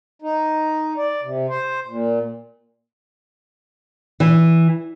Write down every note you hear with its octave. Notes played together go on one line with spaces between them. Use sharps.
D#4
D5
C3
C5
A#2
E3